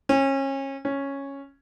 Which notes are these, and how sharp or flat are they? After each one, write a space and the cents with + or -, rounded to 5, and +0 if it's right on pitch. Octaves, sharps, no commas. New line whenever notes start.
C#4 -30
C#4 -5